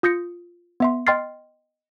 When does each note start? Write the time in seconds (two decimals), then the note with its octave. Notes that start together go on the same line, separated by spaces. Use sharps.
0.03 F4 D#6 G6 A#6 C#7
0.80 B3 E5 C6
1.07 D#5 G5 C6 F6 A6 C7